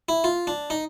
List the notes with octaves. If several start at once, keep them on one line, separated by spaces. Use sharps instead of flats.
E4
F4
D4
D#4